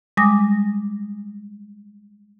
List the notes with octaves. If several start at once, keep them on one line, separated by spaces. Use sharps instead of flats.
G3 G#3 G#5 D6 D#6 A#6